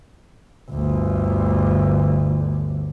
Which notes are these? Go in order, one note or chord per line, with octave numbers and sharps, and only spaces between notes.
G1 D2